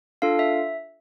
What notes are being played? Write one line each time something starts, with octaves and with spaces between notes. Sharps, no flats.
D4 F4 A4 F5
E5